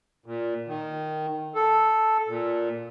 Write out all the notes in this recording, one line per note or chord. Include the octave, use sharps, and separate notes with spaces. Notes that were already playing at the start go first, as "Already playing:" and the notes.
A#2
D#3
A4
A#2